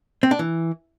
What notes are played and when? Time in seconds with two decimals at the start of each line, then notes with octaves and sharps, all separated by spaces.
0.23 C4
0.31 D4
0.39 E3